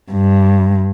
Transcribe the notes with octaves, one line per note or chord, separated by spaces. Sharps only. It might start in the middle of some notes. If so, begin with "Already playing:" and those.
G2